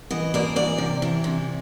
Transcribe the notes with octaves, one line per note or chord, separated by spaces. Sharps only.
E3 D#5
A#3 D5
E3 D5
C3
E3
C3